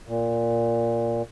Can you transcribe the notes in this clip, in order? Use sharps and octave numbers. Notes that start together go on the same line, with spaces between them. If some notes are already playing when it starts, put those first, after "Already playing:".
A#2